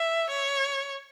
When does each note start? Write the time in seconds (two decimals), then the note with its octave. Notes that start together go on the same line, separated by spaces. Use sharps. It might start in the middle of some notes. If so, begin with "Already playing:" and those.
Already playing: E5
0.30 C#5